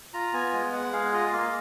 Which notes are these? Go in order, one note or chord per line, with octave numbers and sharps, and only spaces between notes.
F4 A#5
B3 G#5
G#3
G#3 F#5
G#4 F5
F4 D#5
A#3 F5